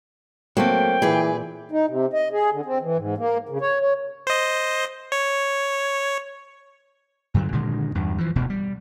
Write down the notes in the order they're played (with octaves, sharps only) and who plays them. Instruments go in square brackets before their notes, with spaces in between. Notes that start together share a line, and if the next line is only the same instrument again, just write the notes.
[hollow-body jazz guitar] F#3 A3 C4 [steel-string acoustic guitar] A#3 [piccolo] G5
[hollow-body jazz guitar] A#2 [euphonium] E3 [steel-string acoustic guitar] G#4 B4
[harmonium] D#4
C3
D#5
G#4
D3
C4
E3
G#2
A#3
C#3
C#5
C#5
[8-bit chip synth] C5 D#5
C#5
[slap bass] G2 D3 E3 F#3
A#2 D3 D#3 G#3
E2 G2
E3 F3
E1 D2 B2
G3